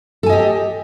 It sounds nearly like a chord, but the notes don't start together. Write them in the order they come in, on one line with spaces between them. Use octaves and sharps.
A4 G#5 D#5 G4